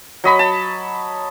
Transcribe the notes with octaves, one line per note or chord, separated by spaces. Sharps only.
F#3 D#5 B5
A5